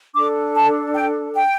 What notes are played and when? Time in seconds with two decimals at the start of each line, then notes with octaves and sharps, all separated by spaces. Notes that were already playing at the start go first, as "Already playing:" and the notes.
0.15 D4 A4 D6
0.54 A5
0.94 G5
1.35 G5